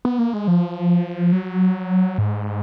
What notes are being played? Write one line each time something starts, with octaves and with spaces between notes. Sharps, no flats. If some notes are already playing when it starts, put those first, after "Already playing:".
B3
A#3
G#3
F3
F#3
G#2